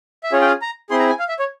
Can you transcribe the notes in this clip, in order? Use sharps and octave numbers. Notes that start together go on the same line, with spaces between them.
E5
C#4 F4 G#4 C#5
G5
F5
A#5
C4 E4 G#4 C6
A#5
G#5
F5
E5
C#5